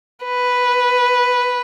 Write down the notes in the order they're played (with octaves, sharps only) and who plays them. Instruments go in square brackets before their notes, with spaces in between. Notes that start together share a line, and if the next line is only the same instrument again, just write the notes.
[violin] B4